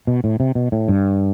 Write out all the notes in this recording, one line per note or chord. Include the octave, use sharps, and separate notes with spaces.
B2
A2
C3
B2
A2
G2